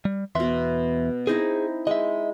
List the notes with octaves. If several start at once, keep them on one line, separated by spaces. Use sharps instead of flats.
G3
E2 B2 B3 E5 C6
C4 D#4 E4 G#4
G#3 D#5 E5